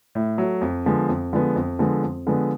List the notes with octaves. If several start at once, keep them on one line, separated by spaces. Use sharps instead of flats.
A2
F#3 A3
F2
D3 F3 G#3 B3
F2
D3 F3 G#3 B3
F2
D3 F3 G#3 B3
F2
D3 F3 G#3 B3